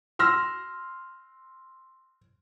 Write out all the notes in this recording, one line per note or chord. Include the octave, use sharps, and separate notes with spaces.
C6 E6 F6 A#6